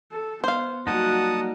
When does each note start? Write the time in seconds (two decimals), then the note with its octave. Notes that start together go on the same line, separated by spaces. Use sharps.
0.12 A4
0.44 B3 C5 F5
0.87 F#3 G3 A#3 D#4 F#4 F#5 A5 D#6